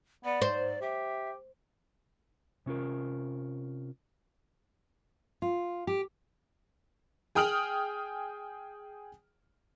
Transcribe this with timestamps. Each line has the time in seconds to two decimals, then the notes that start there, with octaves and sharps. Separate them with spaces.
0.25 B3 D5
0.42 G#2 C5
0.82 G4 E5
2.66 C3 C#4 F4 A#4
5.42 F4
5.87 G4
7.35 G#4 G5 D#6 F6 D7 F#7